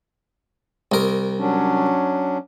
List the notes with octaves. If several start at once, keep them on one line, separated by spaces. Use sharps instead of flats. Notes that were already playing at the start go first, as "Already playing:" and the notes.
C2 A#4
F#3 C#4 D4